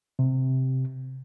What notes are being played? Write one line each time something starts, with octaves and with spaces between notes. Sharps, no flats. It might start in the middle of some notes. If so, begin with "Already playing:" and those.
C3